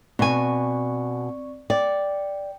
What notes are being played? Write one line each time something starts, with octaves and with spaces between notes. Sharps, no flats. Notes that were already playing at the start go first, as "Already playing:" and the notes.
B2 C4 D5 G#5 C#6
D5 G5